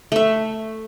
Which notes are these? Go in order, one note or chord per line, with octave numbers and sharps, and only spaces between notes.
A3 E5